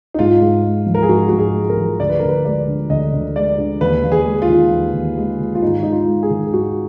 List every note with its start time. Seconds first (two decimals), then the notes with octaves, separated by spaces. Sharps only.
0.14 D#4
0.19 G#2 F4
0.41 G#2
0.64 G#3
0.86 F3
0.94 A#4
1.03 G#4
1.09 G#2 F#4
1.28 G#2 F#4
1.39 G#4
1.54 G#3
1.70 A#4
1.77 F3
2.00 D2 D5
2.09 B4
2.19 D2 A#4
2.29 B4
2.45 G#3 D5
2.68 D3
2.90 D2 D#5
3.13 D2
3.35 G#3 D5
3.58 D3
3.81 D#2 B4
4.03 D#2
4.12 G#4
4.26 G#3
4.42 F4
4.49 D#3
4.72 D#2
4.94 D#2
5.17 G#3
5.40 D#3
5.55 F4
5.62 G#2 D#4
5.83 G#2 D#4
5.92 F4
6.08 G#3
6.23 G#4
6.30 D#3
6.53 G#2 F#4